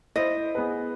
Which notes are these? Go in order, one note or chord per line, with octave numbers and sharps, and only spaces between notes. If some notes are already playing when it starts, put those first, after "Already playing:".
E4 C5 D#5
B3 G#4 B4